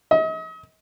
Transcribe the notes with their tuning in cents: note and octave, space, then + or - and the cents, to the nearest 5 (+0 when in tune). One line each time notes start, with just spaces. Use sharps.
D#5 +40